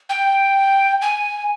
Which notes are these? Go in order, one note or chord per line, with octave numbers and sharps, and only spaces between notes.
G5
G#5